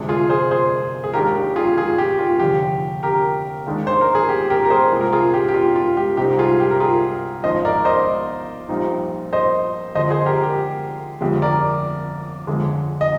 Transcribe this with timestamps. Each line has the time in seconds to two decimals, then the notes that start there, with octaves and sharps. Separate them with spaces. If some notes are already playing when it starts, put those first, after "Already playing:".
Already playing: D2 C3 F3 G#3 D4
0.09 F4 G#4
0.30 G#4 C5
0.51 G#4 C5
1.04 G#4
1.14 D#2 D#3 G#3 D4 G4 A#4
1.35 G4
1.56 F4 G#4
1.77 F4 G#4
1.98 G4
2.19 F4
2.39 F1 D#2 D3 G4
3.03 G4 A#4
3.66 D#2 D#3 G#3 D4
3.87 C5
4.01 A#4
4.15 G#4
4.29 G4
4.50 G4 A#4
4.65 A#4
4.70 G#4 C5
4.92 C2 A#2 G#3 C4
5.01 A#4
5.13 F4 G#4
5.34 G4
5.48 G4
5.54 F4
5.76 F4
5.97 G4
6.17 C2 A#2 G3 C4 D#4 G4
6.39 F4 G#4
6.60 G4
6.71 A#4
6.80 F4 G#4
7.43 G#1 G#2 F3 C5 D#5
7.65 A#4 D5
7.85 C5 D#5
8.69 A#1 A#2 G3 C4 D#4
9.33 C5 D#5
9.95 D2 D3 F3 C5 D#5
10.10 G#4 C5
10.26 G4 A#4
10.43 G4
11.21 G1 F2 D3 G#3 G4
11.42 A#4 D5
12.47 G1 F2 D3 F3 G#3
13.01 D#5